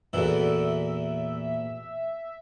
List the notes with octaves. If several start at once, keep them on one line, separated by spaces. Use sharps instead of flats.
E2 A#2 E3 F#4 A4 E5